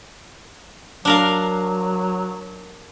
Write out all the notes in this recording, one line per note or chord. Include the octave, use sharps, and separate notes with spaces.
F#3 D4 A#4 F5